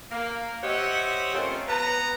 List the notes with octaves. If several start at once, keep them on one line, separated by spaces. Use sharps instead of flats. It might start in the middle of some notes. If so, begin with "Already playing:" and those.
A#3
G4 C5 C#5 D#5 E5 F#5
A3 A#3 C4 C#4 F4
B3 B4 A#5